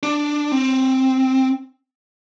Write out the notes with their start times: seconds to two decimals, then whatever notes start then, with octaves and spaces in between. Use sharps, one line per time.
0.03 D4
0.52 C4